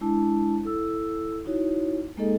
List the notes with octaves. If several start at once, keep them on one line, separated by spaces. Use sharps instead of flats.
G#3 D4 E4 A5
E4 A4 E6
D#4 E4 F#4 C#5
G#3 A#3 D#4 G#4 A4 D#5